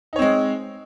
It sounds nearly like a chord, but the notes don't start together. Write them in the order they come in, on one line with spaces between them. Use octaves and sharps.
D#4 C#5 C4 G#3